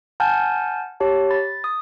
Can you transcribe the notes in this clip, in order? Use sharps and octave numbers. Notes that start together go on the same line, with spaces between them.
F#5 G#5 A5 F6 G6
G4 C#5 A5
B5 A6
D#6